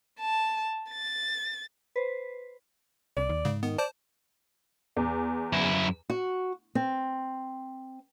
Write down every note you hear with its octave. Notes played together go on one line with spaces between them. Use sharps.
A5
A6
B4 C5
C2 D5
D#2
G#2 C#3
D#3 B3
C5 D5 A5
E2
F#2 E4
F#4
C4